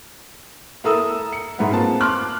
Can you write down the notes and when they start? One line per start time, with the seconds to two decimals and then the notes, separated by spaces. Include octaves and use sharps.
0.84 E4 A4 A#4 A#5 D#6 E6
1.33 C#7
1.58 G#2 G#3 G#4 B4 E5 F#5
1.71 A#3 C4 F4 A5
2.01 C6 D6 F6 F#6